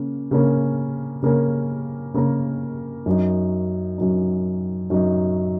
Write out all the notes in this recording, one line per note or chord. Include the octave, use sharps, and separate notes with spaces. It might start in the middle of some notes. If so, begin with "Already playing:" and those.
Already playing: C#3 A#3 C#4
C#3 A#3 C#4 A#4
C#3 A#3 C#4 A#4
C#3 A#3 C#4 A#4
F#2 F#3 D#4
F#2 F#3 D#4
F#2 F#3 D#4